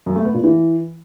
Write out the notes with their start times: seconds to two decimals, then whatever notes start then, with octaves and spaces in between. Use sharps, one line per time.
0.06 F#2
0.16 A3
0.25 B3
0.34 A#2
0.44 E3